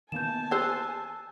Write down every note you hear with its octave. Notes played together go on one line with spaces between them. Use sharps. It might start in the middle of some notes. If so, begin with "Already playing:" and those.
D#3 A#3 B3 G#5 A5 G6 E7
G4 C5 E6 F#6 C7